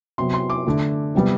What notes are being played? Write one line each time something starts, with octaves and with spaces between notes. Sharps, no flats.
C3 F#3 B3 C6
C6
D6
D3 A3
C3 G3 B3